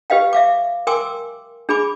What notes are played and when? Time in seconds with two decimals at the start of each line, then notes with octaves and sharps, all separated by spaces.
0.10 G4 B4 D#5 F5 G5
0.33 E5 F5 D6
0.87 A#4 G5 G#5 C6 D6 E6
1.69 D4 G#4 G#5 B5 D6